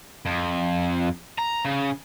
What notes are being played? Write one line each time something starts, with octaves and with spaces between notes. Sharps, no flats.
F2
A#5
C#3